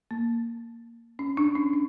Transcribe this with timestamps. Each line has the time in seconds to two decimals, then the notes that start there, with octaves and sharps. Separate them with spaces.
0.11 A#3
1.19 C#4
1.37 D4
1.56 C#4
1.73 C#4